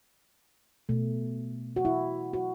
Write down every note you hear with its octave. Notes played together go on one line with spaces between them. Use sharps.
B2 A3
F#4
E4
F#4